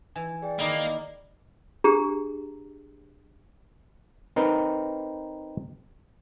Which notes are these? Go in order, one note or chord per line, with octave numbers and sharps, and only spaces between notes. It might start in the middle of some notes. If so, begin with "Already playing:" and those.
E3 G#5
G#4 D5 G5
D#3 A#3 E4 D#5 A#5 D6
D4 G4 G#4 A#5
C4 D#4 A#4 B4